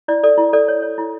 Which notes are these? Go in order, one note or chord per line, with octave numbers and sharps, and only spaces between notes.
E4 D5
A4 D5
E4
A4 D5
C#5
C#5
E4